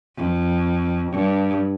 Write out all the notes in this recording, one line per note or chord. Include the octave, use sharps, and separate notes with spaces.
F2
G2